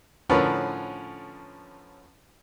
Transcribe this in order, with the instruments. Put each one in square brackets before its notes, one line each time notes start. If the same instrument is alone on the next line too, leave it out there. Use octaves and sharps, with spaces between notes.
[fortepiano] A2 D3 F3 C#4 A#4 B4